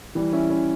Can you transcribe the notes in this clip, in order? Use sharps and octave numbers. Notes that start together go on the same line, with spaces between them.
E3 G3
C#4 E4
C#4 E4